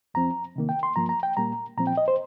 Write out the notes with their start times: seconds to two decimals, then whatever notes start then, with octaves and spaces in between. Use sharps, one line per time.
0.14 F2 F3 C4 A#5
0.56 C3 D#3 A#3
0.69 G5
0.83 C6
0.96 G2 F3 A#3 A#5
1.09 A#5
1.23 G5
1.37 A#2 G3 A#3 A#5
1.78 A#2 F3 C4 A#5
1.87 G5
1.97 D#5
2.08 C5